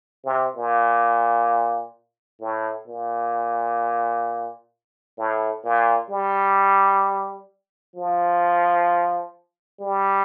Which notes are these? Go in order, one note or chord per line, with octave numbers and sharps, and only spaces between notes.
C3
A#2
A2
A#2
A2
A#2
G3
F3
G3